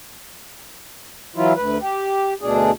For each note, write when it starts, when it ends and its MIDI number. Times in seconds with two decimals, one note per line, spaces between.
1.36 1.53 52
1.36 1.53 54
1.36 1.53 64
1.36 1.53 65
1.56 1.78 38
1.56 1.78 71
1.80 2.34 67
2.41 2.71 38
2.41 2.71 47
2.41 2.71 62
2.41 2.71 68